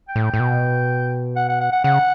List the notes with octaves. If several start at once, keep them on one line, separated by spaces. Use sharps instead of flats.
G5
A2
G5
A2
B2
F#5
F#5
F#5
F#5
C#3 F#5